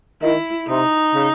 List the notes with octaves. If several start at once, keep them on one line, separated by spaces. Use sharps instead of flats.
D#3 E4
C3 D#4
C#3